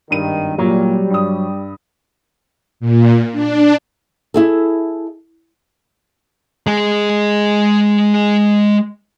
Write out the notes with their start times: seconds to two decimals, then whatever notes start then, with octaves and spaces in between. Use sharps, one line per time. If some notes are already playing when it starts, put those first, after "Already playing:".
0.10 G#1 G2 D#3 D#7
0.58 A#2 F#3 G3 A#3
1.10 G2 D#6
2.80 A#2
3.32 D4
4.34 E4 G#4 A4
6.67 G#3 G#4